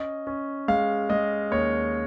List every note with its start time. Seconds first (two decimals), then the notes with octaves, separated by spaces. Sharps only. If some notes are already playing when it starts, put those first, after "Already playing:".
Already playing: C#4 D#5
0.27 C#4
0.68 G#3 F5
1.10 G#3 D#5
1.51 D#2 C#5